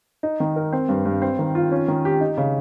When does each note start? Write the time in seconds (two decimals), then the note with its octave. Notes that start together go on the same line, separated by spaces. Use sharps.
0.23 D#4
0.40 D#3
0.56 A#4
0.73 C4
0.89 G2
1.05 G2
1.22 C4
1.39 D#3
1.55 F4
1.71 C#4
1.88 D#3
2.05 G4
2.21 D#4
2.37 C#3